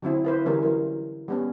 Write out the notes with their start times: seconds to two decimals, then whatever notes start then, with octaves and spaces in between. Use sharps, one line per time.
0.02 D3 F#3 C4 E4
0.25 E4 B4 C5
0.45 D3 E3 G3 C#4 E4 A#4
0.63 F#3 A#4
1.28 G3 B3 C#4